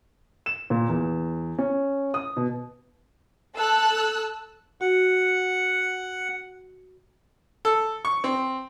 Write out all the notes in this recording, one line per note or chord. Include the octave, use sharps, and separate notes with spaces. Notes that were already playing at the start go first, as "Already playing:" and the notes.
E7
A#2
E2
C#4
D#6
B2
A4 A5 E6 F#6
F#4 F#5
A4
C#6
C4